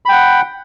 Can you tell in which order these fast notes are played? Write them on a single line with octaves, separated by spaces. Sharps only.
B5 G5 F#5